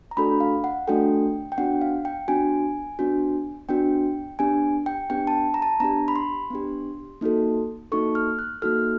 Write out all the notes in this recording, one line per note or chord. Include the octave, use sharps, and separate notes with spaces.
A#5
A3 D4 F#4 A4 B5
F5
F#5
A3 D4 F#4 A4 G5
G5
B3 D4 F#4 F#5
F5
G5
B3 D4 F#4 G#5
B3 D4 F#4
B3 D4 F#4 G5
B3 D4 G4 G#5
G5
B3 D4 G4 G5
A5
A#5
A5
B3 D4 G4 A#5
B5
C6
B3 D4 G4
A#3 D#4 F#4 A4
A#3 D#4 F#4 A4 C#6
F6
F#6
A#3 D#4 F#4 A4 F6